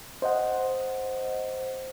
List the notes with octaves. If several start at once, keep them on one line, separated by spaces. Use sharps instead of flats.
C5 D#5 F#5